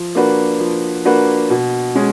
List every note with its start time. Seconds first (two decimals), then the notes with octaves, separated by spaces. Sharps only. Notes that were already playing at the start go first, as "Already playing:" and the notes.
Already playing: F3
0.15 A#3 D4 F#4 B4
0.60 F3
1.05 A#3 D4 F#4 B4
1.50 B2
1.95 G#3 C#4